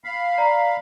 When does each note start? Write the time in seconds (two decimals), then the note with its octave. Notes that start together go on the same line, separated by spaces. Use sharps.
0.04 F5 B5
0.38 D5 A#5